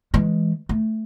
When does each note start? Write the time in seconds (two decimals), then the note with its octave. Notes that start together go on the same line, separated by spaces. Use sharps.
0.14 E3 G#3
0.69 A3